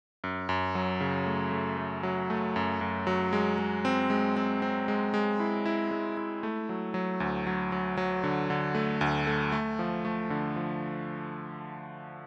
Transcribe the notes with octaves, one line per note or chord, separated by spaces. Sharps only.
F#2
F#2
F#3
C#3
A3
A3
A3
F#3
A3
F#2
F#2
F#3
G#3
G#3
C4
G#3
C4
C4
G#3
G#3
E4
E4
G#3
E4
A3
F#3
F#3
D2
F#3
F#3
F#3
D3
D3
A3
D2
A3
A3
F3
A3
D3
F3